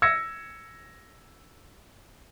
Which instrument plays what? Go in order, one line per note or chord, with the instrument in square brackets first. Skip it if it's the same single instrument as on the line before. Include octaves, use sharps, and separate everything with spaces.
[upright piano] E6 G#6 A#6 C#7